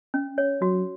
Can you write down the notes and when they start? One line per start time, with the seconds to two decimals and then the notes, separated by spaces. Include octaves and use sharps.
0.14 C#4
0.38 C#5
0.61 F#3 F#4